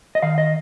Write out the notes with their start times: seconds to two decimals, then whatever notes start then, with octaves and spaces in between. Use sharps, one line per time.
0.15 D#5
0.23 D#3 F5
0.38 D#5